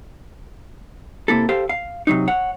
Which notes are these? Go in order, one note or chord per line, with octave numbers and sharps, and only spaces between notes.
C3 A#3 E4 A4
G4 A4 C5 F5
F5
C3 F#3 D#4
C#5 F#5